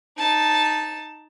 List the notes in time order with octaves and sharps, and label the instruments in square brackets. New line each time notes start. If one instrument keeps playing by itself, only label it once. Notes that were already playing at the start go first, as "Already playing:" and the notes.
[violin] D#4 A5